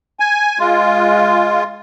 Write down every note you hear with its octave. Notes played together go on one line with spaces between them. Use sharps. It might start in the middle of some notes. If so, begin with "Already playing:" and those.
G#5
G#3 F4